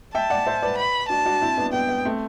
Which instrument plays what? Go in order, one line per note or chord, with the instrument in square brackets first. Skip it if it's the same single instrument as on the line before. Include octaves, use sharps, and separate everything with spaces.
[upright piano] E5 G5 [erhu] A5
[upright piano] D5 F#5
C5 E5
B4 D5
[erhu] B5
[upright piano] D4 F#4 [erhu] A5
[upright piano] D4 F#4
C4 E4
B3 D4
[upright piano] B3 [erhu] G5
[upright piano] B3
A3 C4